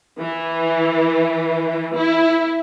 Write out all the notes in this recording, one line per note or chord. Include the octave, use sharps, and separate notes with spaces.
E3
E4